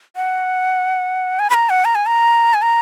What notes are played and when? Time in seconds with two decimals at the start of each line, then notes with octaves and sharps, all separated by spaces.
0.16 F#5
1.39 G#5
1.50 B5
1.54 A#5
1.70 F#5
1.85 A#5
1.95 G#5
2.06 A#5
2.54 G#5
2.62 A#5